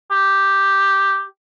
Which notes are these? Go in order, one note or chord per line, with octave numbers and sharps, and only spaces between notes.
G4